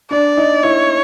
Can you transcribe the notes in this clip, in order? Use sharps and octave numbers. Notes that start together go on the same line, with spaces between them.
D4 D5
D#4
E4 C#5